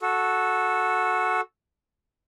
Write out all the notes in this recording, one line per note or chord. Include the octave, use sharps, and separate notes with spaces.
F#4 A4